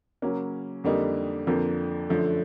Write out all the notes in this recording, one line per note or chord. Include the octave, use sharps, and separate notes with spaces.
C#3 F#3 A#3 C#4
F2 D3 G3 A#3 D#4
F2 D3 F3 A#3
F#2 D3 F3 A3